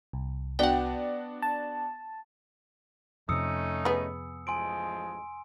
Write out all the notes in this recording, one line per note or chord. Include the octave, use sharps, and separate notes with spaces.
C2
B3 D4 F#4 F#5 G5
A5
F2 C3 A3 C#4 D#4 D#6 E6 C#7
B3 G#4
A1 F3 G#3 G#5 C6 D7